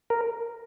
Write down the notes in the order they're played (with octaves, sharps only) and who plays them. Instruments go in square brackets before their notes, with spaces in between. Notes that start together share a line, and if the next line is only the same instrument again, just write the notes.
[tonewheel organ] A#4